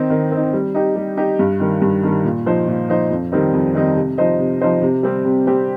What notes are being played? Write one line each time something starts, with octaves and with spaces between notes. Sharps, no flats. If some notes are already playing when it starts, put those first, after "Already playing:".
Already playing: D#3 C4 D#4
D#3
C4 D#4
G3
D#4 G4
G3
D#4 G4
G2
D#3 G3
G2
D#3 G3
A#2
F3 D#4 C5
A#2
F3 D#4 C5
F2
D#3 G3 C4 D#4
F2
D#3 G3 C4 D#4
C3
F3 D#4 C5 D#5
C3
F3 D#4 C5 D#5
C3
G3 C4 G4
C3
G3 C4 G4